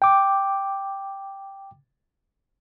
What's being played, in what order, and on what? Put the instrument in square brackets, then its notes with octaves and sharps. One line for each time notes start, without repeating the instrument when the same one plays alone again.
[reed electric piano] G5 D6